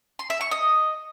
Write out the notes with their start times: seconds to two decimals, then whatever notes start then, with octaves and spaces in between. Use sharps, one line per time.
0.19 C6
0.30 E5
0.41 C#6
0.51 D#5